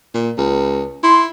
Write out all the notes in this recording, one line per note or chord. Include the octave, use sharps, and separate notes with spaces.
A#2
C#2
E4 C6